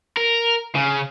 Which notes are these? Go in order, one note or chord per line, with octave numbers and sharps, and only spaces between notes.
A#4
C#3